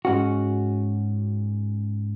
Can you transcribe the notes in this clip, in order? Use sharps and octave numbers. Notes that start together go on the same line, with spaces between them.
G#2 C#4 F#4